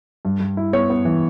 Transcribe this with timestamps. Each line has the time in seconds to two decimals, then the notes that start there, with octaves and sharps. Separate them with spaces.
0.25 G2
0.40 G2
0.57 E4
0.73 B3 C#5
0.90 B3
1.05 E3